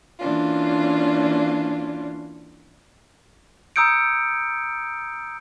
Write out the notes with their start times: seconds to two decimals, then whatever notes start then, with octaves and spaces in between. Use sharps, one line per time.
0.19 E3 A#3 C#4 D4 F4
3.76 A#5 D#6 E6 G6 C#7 D7